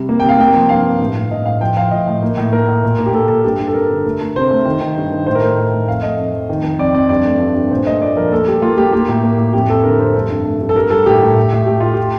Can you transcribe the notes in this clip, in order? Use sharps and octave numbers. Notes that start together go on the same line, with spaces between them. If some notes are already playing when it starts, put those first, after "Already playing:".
Already playing: C3 G3
A#3
C3 G5
F5
A#3 G5
F3
G2 F5
G2
A2
A2
A2 D#5
A2 F5
F3 G5
F3 F5
A2 D#5
A2
A#3
A2
A#3 A#4
A2
A#2
A#3
G4
A#3 A4
A#2 A4
G2 G4
G2
A4
G2 A#4
D3
A3
A3
C3 C5
A3
D#3
D#3
G2
D#3
A2 C5
A#4
A3 C5
A2
A3
F2 F5
A3 D#5
F2
F2
D#3
D#3
F2 D5
F2 D5
G2 D5
A3
G2
G2
A#2 C5
A3 D#5
A#2 D5
F3 A#4
A#3 A4
G3 G4
A#3 F4
A#3 G4
A#3 G4
A2
A#3
A2
F2 G4
F2 A4
D3 A#4
F2 C5
G2 A4
G2
A3
G2
A4
G3 A#4
G3 A4
A2 G4
A2
A2
A2
A3 G4
A2 F4
G4